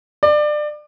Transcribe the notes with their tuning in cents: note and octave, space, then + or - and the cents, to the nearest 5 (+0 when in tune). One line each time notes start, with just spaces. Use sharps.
D5 +25